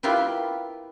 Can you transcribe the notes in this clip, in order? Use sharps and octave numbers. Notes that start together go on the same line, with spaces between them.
E4 F4 G4 A#4 B4